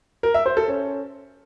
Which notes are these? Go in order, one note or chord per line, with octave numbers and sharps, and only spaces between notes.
A#4
E5
C5
A4
C#4